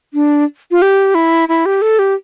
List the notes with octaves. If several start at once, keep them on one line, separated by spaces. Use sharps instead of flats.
D4
F4
G4
E4
E4
G4
A4
G4